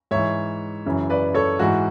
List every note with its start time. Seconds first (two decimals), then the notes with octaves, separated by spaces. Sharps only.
0.11 G#2 E3 C#5 E5
0.86 F#2 C#3 E3
1.10 B4 D5
1.34 A4 C#5
1.59 G#2 E3 F#4